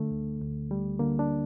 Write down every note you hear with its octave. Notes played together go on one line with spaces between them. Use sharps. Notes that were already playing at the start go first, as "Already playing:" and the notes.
Already playing: D3 A3
D2
D2
G3
D3 A#3
D4